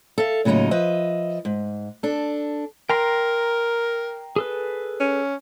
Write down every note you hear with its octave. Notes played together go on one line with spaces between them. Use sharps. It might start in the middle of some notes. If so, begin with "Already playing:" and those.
A4 E5 F5
A2 C#3 F#3 A#3 D#4 F4
F3 B4 D#5 E5
G#2
D4 A4
A#4 G5 A#5 C6
G#4 A4 B4
C#4